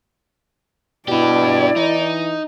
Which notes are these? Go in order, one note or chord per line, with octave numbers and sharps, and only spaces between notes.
B2 D4 E4 G4 D5
E3 D#4